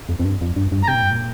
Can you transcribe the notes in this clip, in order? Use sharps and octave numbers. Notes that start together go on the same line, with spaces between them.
F2
F2
G2
F2
G2
G2
A#5
C3 G5
A#2
G2
A#2